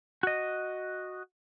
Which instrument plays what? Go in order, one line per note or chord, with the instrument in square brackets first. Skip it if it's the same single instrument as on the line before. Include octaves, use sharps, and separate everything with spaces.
[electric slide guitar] F#4 D#5